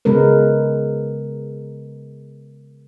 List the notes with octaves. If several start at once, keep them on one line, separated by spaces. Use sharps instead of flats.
C#3 G#3 B3 A#4 B4